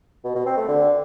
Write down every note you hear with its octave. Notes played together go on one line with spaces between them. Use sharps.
B2
B2
C4
A3
D3